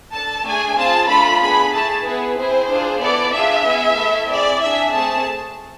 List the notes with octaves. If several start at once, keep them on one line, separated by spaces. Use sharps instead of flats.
D4 A4 A5
A3 D4 G#4 G#5
C4 F4 G#4 A5
A3 D4 F4 A4 B5
B3 D4 G#4 B5
A3 E4 G#4 A5
B3 E4 G#4 B4
C4 E4 G#4 C5
D4 F4 G#4
B3 E4 A4 D5
D4 F4 G#4 E5
B3 E4 G#4
A3 E4 A4
C4 E4 G#4 D5
D4 G#4 E5
A3 C4 G#4 A5